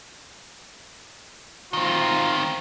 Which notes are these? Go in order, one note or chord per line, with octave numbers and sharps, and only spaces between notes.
D#3 C4 F4